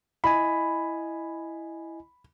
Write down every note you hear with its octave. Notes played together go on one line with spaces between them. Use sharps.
E4 D#5 G#5 B5